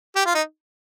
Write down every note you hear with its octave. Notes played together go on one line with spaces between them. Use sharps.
G4
F4
D#4